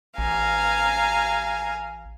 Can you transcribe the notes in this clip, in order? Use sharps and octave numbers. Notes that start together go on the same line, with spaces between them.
A1 F5 G#5 A#5